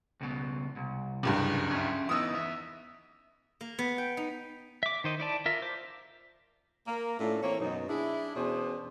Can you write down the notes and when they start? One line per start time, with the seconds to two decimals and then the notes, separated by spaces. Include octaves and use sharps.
0.21 C#2 B2
0.76 C2
1.23 F#1 C#2 G2
1.71 C#4 E5
2.09 E3 B3 D#4 D#6 E6
2.34 E2 E5
3.61 A#3
3.79 B3
3.98 G5
4.17 D#4
4.83 E5 D6
5.04 D#3 C5 D#5
5.20 E4 D5 A5
5.46 F4 A#4 E5
5.62 C5 D6
6.87 A#3 A#4
7.20 A2 A3 C#4 D4 F4 A4
7.42 E3 A#3 C4 C#5
7.60 F#2 B2 D#4
7.88 D4 E4 G#4
8.35 E2 B2 C#4 D4 G#4 C5